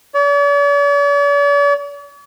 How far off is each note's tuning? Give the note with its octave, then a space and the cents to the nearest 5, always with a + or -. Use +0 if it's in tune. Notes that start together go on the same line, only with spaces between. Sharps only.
D5 -45